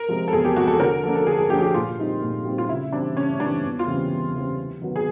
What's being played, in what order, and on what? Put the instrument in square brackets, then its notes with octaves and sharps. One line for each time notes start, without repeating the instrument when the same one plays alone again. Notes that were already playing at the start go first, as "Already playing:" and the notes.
Already playing: [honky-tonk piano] A#4
[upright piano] C3 F3 G#3
[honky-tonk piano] A4
[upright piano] E2 [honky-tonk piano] G#4
[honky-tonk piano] G4
[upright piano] C3 F3 G#3 [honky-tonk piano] F#4
[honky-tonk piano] A4
[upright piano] D3 [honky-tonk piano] A#4
[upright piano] F3 A#3 D4 [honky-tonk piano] A4
[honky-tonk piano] A4
[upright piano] D3 [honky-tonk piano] G#4
[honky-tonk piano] G#4
[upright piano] F3 A#3 D4 [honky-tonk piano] G4
[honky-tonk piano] G#4
G4
[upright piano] A#2 [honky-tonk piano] F4
[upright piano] G3 C4 D#4
A#2
G3 C4 D#4
[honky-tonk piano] F4
[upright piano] C#3 [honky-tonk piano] E4
[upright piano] E3 G3 C4 [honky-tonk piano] D4
[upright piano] C#3 [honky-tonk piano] C#4
[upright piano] E3 G3 C4 [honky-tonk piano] D4
[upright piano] E2
[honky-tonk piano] F4
[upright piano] C#3 E3 G3 C4
E2
C#3 E3 G3 C4
C3
D#3 F#3 B3
[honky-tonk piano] G#4